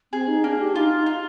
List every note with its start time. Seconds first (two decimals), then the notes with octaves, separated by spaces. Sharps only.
0.12 C4 G#4
0.27 D#4
0.44 A#3 D4
0.59 G4
0.75 D#4 F4
0.95 D#4
1.06 F4